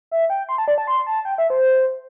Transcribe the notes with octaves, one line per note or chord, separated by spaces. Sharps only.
E5
G5
C6
A5
D5
A5
C6
A5
G5
E5
C5